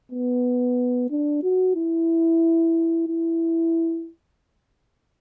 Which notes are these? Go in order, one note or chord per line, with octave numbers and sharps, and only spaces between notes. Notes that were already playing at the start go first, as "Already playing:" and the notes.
B3
D4
F#4
E4
E4